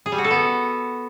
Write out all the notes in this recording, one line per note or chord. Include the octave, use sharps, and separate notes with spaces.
G#4
G3
F#4
A4
B3